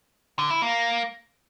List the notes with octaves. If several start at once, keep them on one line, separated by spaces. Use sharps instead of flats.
D3
E4
A#3